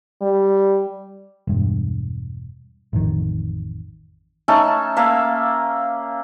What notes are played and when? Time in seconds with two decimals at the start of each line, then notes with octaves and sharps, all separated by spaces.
0.22 G3
1.47 E1 G2
2.93 A1 F2 D#3
4.48 A3 C#4 D#4 A5
4.96 A#3 A4 E5 F5